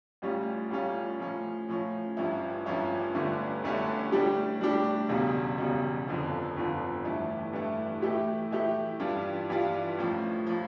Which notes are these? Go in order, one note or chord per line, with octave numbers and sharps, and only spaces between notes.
A1 A2 G3 C#4 F4
A1 A2 G3 C#4 F4
A2 F3 C#4
A2 F3 C#4
A1 G2 F3 C#4 E4
A1 G2 F3 C#4 E4
G1 G2 D3 A3 C#4
G1 G2 D3 A3 C#4
A2 G3 D4 G4
A2 G3 D4 G4
E1 E2 C#3 G3
E1 E2 C#3 G3
G1 F2 D3 F3
G1 F2 D3 F3
G2 E3 A3 E4
G2 E3 A3 E4
A2 E3 A3 E4 G4
A2 E3 A3 E4 G4
G2 E3 G3 D4 F4
G2 E3 G3 D4 F4
A1 A2 F3
A2 F3